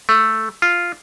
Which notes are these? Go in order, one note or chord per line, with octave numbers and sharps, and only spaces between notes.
A3
F4